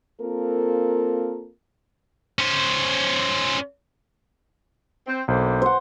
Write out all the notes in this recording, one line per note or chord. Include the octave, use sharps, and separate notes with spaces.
A#3 C4 F4 A4 A#4
C#4 C5
C4
B1 D3 A#3 C5
C5 F#5